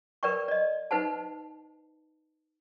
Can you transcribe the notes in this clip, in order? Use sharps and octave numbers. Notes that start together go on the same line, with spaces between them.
A#4 B4 D5 G5 C#6
D5 D#5
D#4 B4 C5 F#5 A5